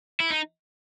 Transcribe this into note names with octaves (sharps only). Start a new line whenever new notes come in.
E4
D#4